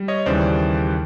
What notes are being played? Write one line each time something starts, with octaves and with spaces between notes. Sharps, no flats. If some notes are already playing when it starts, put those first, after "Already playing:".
Already playing: G3
C#5 D#5
D#2 C#3 E3 G3 C5 D5